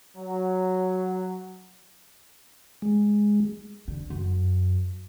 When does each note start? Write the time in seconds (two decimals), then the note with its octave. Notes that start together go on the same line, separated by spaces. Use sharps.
0.17 F#3
2.82 G#3
3.88 D3
4.10 F#2